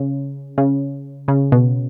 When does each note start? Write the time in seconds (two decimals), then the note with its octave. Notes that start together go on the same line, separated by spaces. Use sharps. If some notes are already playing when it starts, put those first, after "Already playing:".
Already playing: C#3
0.58 C#3
1.28 C#3
1.52 B2